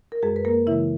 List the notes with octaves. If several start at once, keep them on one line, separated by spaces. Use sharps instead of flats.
A#4
F#2 G#3 G#4
B4
A#3 A#4
C#3 E3 G#3 E4 E5